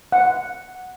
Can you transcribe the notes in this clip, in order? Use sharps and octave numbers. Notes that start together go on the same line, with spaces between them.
F#5